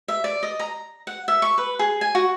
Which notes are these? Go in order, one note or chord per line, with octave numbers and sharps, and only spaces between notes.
E5
D5
D#5
A#5
F#5
E5
C#6
B4
G#4
G#5
F#4